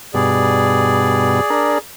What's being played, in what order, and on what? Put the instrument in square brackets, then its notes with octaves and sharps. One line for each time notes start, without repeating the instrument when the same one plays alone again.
[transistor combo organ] G2 B2 [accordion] G#4 D5
[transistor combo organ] D4 A#4